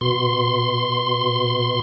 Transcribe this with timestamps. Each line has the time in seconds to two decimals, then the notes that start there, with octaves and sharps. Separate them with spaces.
0.01 B2 C6